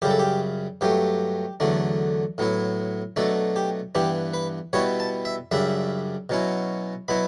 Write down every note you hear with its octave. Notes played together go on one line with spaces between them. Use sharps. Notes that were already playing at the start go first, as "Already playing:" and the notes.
F#2 C#3 G3 G4
A4
G4
G2 F#3 A3 G4
E2 D3 F#3 A3 D4
A2 F#3 B3 E4
B2 F#3 A3 D4 A4
G4
G2 E3 B3 D4 G4
B4
B2 G3 B3 E4 C#5
A5
E5
F#2 C#3 G3 D4 E5
B2 F#3 C#4 E4
B2 F#3 B3 E4 B5